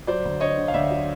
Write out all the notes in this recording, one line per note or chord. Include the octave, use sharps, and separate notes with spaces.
F#3 C5 D5
D2
D3 C#5 D#5
D3
F5
D2 D5 E5
F#3